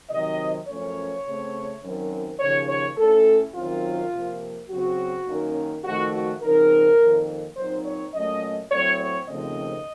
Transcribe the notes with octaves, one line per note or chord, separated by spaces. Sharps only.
C3 D#3 F#3 C4 D#5
F#2 F3 A3 C#4 C#5
C#3 A3 C4
F#2 D#3 F#3 C4
D#2 C#3 F3 C#5
C#5
A2 A3 C#4 A4
F#2 D#3 F#3 C4 F4
C3 F3 A#3
C#3 F#3 C4 F#4
F#2 D#3 A#3 C#4
F2 D#3 A3 F#4
F#4
C#3 F3 C4 D#4 A#4
F2 D#3 A#3
A#2 F#3 C4 D#4 C5
C#5
A#2 F#3 A3 C#4 D#5
A2 F#3 C4 C#5
C#5
D#2 C#3 F3 A3 C4 D#5